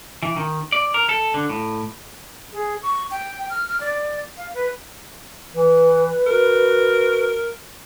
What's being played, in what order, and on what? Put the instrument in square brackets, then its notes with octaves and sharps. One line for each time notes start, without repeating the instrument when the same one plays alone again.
[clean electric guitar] E3
D#3
D5
A#4
A4
D3
A2
[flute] G#4
C#6
G5
F6
F6
D5
F5
B4
[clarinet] E3 [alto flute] B4
[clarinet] F#4 [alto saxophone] A#4